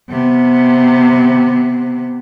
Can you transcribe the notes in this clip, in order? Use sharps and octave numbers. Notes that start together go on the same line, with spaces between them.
C3 B3